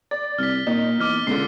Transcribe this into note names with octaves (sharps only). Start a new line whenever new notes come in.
D5 A6
C2 F6 B6
A#2 D#4
E2 D6 F6 B6
C#2 A#2 D3 C7